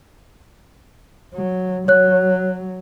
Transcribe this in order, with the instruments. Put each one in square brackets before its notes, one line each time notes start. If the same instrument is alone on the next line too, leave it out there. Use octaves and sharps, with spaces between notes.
[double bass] F#3
[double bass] F#3 [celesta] C#5 F#6